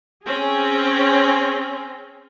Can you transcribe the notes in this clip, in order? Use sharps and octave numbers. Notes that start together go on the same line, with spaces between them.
C4 C#4 G#4